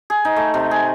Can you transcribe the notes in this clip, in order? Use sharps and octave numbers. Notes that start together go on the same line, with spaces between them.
G#4
D#4
A3
C3
G#4